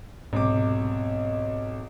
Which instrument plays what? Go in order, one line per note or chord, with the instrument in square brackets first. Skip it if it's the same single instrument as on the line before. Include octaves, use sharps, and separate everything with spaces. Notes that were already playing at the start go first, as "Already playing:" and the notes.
[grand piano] B1 C3 D6 [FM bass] G#2